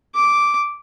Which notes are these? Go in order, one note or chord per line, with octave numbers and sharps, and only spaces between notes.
D6